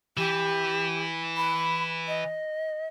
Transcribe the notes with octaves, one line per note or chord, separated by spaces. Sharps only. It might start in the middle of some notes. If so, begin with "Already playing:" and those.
E3 G4
B5
D#5